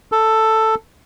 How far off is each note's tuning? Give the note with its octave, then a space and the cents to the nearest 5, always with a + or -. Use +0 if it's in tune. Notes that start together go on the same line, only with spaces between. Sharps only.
A4 +5